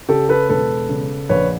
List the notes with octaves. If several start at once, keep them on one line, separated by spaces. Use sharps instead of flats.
C#3 G4 A4
A4 B4
E1 A4 B4
C#3
A#1 B4 C#5